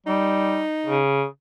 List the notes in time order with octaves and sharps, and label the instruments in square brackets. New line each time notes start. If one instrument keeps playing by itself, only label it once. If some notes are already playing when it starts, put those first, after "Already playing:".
[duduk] G3 [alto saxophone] D#4
[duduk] C#3